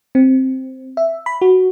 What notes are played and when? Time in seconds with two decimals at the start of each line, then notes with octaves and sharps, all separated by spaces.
0.15 C4
0.97 E5
1.26 B5
1.41 F#4